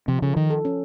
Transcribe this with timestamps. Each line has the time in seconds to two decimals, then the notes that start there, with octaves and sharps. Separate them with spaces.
0.08 C3 F3
0.22 C#3 A4
0.36 D#3 F3
0.50 A4
0.65 C#4